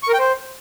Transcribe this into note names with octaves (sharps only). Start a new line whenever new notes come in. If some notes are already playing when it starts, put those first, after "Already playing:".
C#6
A#4
G5
C5